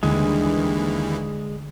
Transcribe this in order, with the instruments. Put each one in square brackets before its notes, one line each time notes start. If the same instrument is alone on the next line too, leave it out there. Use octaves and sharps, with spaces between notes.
[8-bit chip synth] D#2 E3 [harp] D3 G3 [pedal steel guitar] G#3